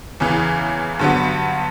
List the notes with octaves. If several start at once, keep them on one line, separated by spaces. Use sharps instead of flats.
E2 C#3 E3
G2 D3 F#3 B3